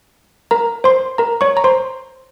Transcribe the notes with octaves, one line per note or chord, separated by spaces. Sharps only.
A#4 A#5
C5 C6
A#4 A#5
C#5 C#6
A#5
C5 C6